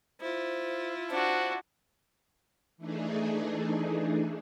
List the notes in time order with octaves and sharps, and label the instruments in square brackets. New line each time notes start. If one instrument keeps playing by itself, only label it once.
[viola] E4 F4 [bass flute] C5
[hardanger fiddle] D4 F#4 [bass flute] C5
[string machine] E3 A3 D4 D#4 G#4